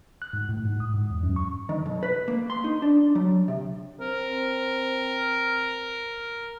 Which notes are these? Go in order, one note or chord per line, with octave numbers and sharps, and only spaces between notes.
F#6
G#2
A2
G#2
D#6
G#2
E2
F#2
C#6
D#3
B1
B4
A#3
C6
D#4
D4
F#3
C3
C4 A#4